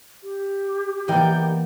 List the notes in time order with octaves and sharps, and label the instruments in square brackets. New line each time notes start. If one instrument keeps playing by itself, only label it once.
[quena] G4
[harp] E3 A#3 B3 [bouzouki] D#4 D5 G5